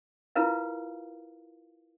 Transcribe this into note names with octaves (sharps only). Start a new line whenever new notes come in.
E4 F4 A#4 B4 F5